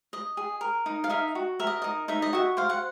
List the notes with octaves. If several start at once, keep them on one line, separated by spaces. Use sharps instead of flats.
D#5
G#4
A#4
D#4
F5
D#4 E5
F#4
A#4 E5
D#5
D#4 D#5
D#4 E5
D#5
F#4 E5
C5 F5
F#5